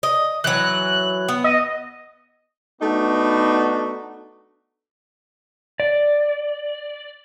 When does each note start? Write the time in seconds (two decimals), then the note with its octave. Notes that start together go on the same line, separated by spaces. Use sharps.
0.03 D#5
0.44 E3 F#3 F#6
1.29 B3
1.44 D#5
2.82 A3 B3 D4 D#4 F#4
5.80 D5